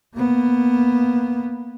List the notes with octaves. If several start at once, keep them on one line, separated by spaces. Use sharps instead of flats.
A#3 B3